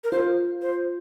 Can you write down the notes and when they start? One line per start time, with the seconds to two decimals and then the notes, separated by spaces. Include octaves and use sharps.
0.04 A#4
0.12 F4 C5
0.62 C5